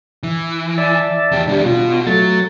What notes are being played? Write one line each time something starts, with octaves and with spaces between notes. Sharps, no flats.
E3
D5 E5 A5
E2 G4
D#2 G3 B3 D4
B2 F4
F#3 A3 A6